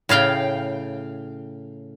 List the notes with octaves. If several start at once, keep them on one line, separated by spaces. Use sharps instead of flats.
A2 C#3 F5 G5